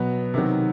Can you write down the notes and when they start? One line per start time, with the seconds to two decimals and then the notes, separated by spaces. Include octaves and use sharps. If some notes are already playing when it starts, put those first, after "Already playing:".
Already playing: B2 F#3 B3
0.34 C3 D#3 F#3